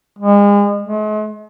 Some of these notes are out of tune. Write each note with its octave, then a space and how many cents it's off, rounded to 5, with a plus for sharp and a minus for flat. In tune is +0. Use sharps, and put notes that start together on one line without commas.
G#3 -35
G#3 +45